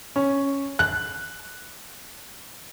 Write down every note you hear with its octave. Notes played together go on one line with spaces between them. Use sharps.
C#4
F#6